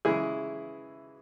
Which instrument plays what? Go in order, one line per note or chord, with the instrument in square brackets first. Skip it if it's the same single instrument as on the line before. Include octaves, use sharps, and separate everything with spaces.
[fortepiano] C#3 E3 G#3 E4 G#4